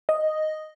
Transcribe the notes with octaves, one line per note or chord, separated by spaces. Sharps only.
D#5